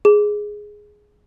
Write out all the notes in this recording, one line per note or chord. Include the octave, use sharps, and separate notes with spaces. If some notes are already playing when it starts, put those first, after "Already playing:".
G#4